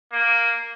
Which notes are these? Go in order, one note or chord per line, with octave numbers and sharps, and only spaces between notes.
A#3